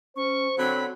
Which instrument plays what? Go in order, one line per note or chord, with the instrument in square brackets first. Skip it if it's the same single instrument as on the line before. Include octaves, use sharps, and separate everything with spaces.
[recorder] C#4 [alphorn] C5 [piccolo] C#6
[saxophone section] D3 F#3 [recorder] C4 [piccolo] B5